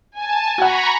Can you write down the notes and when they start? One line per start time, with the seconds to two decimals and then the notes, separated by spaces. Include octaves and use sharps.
0.18 G#5 A5
0.58 F#4 F#5 A#5 B5 C#6